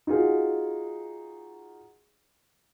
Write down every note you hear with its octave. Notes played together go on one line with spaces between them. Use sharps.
D#4 F4 F#4 G#4